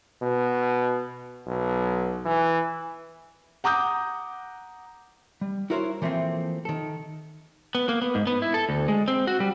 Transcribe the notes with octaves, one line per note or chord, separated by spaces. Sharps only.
B2
B1
E3
F#5 A#5 D6 D#6 G6
G3
E4 F#4 A#4 C5 C#5
E3 F3 A3 A#3 C4
D#3 A4
B3
A#3
B3
G#2
B3
E4
A4
D2
G#3
C4
F#4
G3